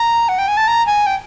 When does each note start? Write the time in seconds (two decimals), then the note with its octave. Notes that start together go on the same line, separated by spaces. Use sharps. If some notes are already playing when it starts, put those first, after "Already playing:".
Already playing: A#5
0.29 F#5
0.39 G5
0.48 G#5
0.57 A5
0.68 A#5
0.86 G#5
1.06 G5